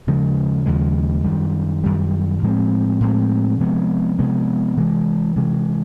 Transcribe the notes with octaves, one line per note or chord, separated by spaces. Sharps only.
D#2 C#3 F3 G#3
D#2 C#3 F3 G#3
F#2 D#3 G3
F#2 D#3 G3
A2 F3 G#3 C4
A2 F3 G#3 C4
C3 F3 G#3 B3
C3 F3 G#3 B3
C3 E3 G#3
C3 E3 G#3